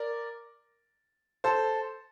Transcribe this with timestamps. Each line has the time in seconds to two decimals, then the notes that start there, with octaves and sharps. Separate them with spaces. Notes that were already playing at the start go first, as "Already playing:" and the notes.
Already playing: A#4 D5
1.44 A4 C5